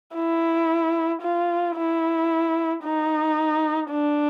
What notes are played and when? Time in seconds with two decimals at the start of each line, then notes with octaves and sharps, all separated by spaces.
0.15 E4
1.22 F4
1.76 E4
2.83 D#4
3.91 D4